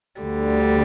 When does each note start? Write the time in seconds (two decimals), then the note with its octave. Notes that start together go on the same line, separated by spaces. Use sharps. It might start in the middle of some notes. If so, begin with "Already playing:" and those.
0.21 D2 D3 G3